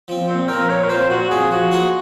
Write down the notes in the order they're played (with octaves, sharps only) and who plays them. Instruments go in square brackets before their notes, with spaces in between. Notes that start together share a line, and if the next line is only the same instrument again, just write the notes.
[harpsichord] F3 C4
[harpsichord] A#2 [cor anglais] C4
[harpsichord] F3 C4 [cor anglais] A#4
[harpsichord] A#2 [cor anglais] C#5
[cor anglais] A#4
[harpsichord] F3 C4 [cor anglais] C5
[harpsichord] A#2 [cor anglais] F#4
[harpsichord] F3 C4 [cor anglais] G#4
[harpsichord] F3 [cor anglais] F#4
[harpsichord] A#3 D#4 G#4 C5